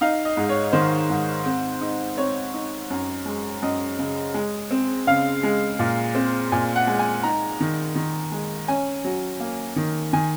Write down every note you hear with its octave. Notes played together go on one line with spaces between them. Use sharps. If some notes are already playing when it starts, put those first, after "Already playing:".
D#4 F5
D#5
G#2
C#5
D#3 C5
G#2
C4
D#4
C4 C#5
D#4
F#2
G#3
F#2 D#5
C#3
G#3
C4
C#3 F5
G#3
A#2
C4
A#2 G#5
F#5
G#3
G#5
D#4 A#5
D#3
D#3
G#3
C#4 G#5
F#3
A#3
D#3
D#3 G#5